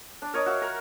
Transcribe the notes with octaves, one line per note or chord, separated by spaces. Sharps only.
D4
A#4 C#5 D#5
F#4 E5 F5
A#4